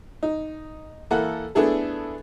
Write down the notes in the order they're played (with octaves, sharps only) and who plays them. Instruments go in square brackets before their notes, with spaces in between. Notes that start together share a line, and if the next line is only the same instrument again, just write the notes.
[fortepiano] D#4
E3 A#3 E4 A4 F#5
A3 B3 D4 E4 G#4 A4